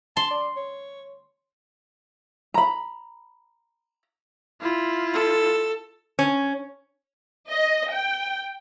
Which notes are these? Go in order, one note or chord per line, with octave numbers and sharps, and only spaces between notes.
A5 C6
D5
C#5
A#5 B5
E4 F4
A4
C#4
D#5
G5